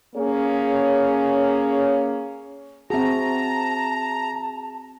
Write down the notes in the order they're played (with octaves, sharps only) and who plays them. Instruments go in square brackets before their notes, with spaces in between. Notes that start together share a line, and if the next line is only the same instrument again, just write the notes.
[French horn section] A#3 C#4 G#4 C#5
[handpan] C4 F#4 [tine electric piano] G#4 E5 [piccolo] A5 [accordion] A#5